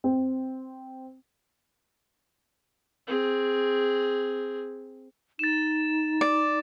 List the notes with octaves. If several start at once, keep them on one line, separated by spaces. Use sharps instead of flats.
C4
C4 G#4
D#4 A6 E7
D5